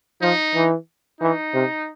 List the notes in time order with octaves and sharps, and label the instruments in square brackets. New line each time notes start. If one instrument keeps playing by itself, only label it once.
[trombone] F3 [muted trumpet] D#4
[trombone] E3
[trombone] E3 [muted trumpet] D#4
[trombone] C3